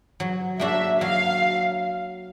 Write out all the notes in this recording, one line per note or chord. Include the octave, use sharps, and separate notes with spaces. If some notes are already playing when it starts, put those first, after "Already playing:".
F#3
A#3 D4 F#4 E5
F#3 F5